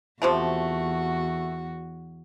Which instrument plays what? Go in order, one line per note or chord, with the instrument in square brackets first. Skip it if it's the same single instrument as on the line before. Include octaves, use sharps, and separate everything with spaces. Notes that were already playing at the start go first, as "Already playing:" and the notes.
[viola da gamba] E2 F#4 [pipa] C3 F3 A3